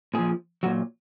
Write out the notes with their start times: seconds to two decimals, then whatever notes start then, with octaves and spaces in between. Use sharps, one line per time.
0.14 A#2 F3 G#4
0.63 A#2 F#3 F#4